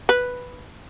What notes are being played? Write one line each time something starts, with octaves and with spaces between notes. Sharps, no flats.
B4